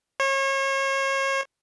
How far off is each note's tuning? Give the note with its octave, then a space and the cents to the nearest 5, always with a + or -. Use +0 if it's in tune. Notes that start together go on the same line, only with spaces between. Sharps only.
C#5 -35